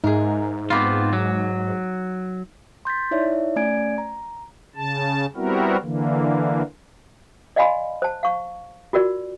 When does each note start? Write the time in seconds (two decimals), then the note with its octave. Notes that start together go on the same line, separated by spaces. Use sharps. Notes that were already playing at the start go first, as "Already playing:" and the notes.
0.04 G#2 D#4 G#4 A#4 E5
0.70 B3 C4 F4 F5 B5 D6
1.13 F#3
2.85 C6 G6 A6 B6
3.11 D#4 E4 C#5 D5 E5
3.56 A3 C#4 D5 G#5 G#6 D7
3.98 A#5
4.76 C#3 A5
5.36 G3 B3 C4 E4 F#4 A#4
5.82 D3 E3 A#3
7.56 D5 D#5 F5 G#5 B5 C6
8.02 C5 A5
8.23 F5 C#6
8.93 F4 F#4 A#4 D5